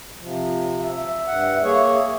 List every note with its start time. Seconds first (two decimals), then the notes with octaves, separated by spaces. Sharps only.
0.21 C3 F3
0.80 E5
1.27 G2 F#5
1.63 A#3 G#4 C#5